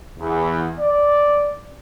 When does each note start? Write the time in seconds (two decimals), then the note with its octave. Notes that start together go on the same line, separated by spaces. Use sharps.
0.19 E2
0.80 D5